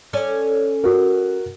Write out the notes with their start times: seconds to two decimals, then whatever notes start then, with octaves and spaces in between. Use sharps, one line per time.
0.13 C#4 A4 D5
0.84 F#4 A#4